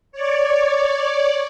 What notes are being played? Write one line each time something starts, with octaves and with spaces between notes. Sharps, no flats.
C#5 D5